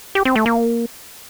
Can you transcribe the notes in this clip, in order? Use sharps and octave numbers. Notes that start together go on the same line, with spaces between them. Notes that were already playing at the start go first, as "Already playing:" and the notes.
G4
C4
A3
A#3